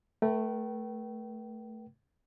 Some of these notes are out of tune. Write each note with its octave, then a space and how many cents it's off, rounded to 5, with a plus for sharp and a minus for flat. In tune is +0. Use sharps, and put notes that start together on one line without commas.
A3 +0 B4 -40 G5 -30